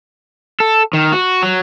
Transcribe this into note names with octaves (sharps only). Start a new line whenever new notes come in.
A4
D#3
F#4
F#3